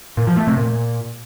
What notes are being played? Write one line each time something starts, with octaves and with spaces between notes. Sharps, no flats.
A#2
F3
A3
C3
A#2